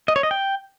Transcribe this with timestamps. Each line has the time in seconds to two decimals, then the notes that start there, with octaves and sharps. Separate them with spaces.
0.08 D#5
0.16 C#5
0.23 D#5
0.31 G5